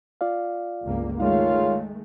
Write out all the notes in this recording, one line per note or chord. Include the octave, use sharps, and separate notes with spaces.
F4 D5 F5
G1 C#2 A#3
D#3 G#3 A3 D#4 F4 A#4 C#5 F5